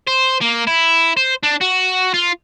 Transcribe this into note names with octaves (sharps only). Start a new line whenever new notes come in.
C5
A#3
E4
C5
D4
F#4
F4